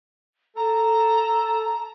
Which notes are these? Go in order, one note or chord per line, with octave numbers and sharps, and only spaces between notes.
A4 A#5